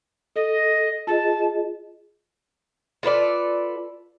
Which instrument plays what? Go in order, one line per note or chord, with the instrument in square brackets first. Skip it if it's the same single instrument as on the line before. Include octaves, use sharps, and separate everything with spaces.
[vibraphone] A4 [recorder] D#5
[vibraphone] F4 G#4 D#5 [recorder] A5
[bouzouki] F4 A4 B4 D5